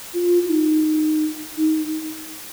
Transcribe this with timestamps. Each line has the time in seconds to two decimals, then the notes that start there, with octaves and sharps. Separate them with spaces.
0.14 F4
0.45 F4
0.50 D#4
1.57 D#4